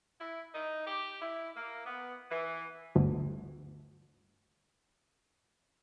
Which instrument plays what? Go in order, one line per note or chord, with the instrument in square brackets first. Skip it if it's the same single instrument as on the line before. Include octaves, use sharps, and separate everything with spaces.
[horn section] E4
D#4
G4
E4
A#3
B3
E3
[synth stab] G1 D2